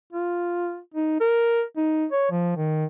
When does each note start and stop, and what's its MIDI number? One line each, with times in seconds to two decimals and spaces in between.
0.13 0.78 65
0.94 1.18 63
1.20 1.63 70
1.77 2.06 63
2.12 2.28 73
2.31 2.54 53
2.56 2.85 51